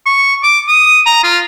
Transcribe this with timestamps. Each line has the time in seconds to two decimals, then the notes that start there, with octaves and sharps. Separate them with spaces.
0.06 C#6
0.43 D6
0.68 D#6
1.06 A#5
1.24 F4